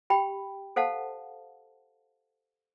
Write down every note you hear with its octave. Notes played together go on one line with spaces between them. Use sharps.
G4 G5 B5
A4 C5 F5 F#5 A5